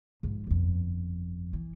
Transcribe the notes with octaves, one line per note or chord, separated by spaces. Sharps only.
G#2 F3
G1 F2
E3